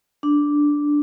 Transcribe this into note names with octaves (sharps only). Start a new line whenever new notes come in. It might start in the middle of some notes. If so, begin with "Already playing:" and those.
D4